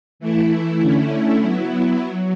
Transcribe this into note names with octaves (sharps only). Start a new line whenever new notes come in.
E3 A3 E4
D3 A3 C#4 E4
F#3 B3 E4
F#3